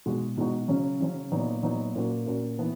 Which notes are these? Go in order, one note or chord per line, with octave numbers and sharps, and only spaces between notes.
B2 G#3 D#4 F#4
B2 G#3 D#4 F#4
C#3 F#3 C#4
C#3 F#3 C#4
A#2 F#3 B3 D#4
A#2 F#3 B3 D#4
A#2 A#3 C#4 F#4
A#2 A#3 C#4 F#4
E3 B3 D#4